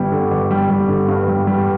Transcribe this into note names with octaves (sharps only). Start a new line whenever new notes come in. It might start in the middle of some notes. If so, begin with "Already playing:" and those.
Already playing: G1 G3
D3
G1
G3
G3
D3
G2
G3
G3